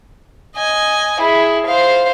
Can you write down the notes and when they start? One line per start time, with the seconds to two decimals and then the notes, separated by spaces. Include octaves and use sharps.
0.56 D#5 G#5
1.19 E4 G#4
1.67 C5 F5